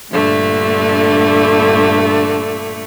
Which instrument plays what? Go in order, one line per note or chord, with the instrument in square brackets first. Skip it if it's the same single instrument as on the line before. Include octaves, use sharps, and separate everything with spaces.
[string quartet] G2 A#2 D3 A3